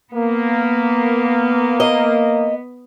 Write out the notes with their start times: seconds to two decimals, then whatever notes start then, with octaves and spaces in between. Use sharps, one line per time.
0.13 A#3 B3
1.80 D#5